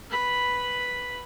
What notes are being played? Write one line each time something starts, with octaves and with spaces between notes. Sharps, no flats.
B4 B5